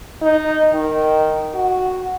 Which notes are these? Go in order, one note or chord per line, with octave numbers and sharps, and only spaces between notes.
D#4
D#3
F#4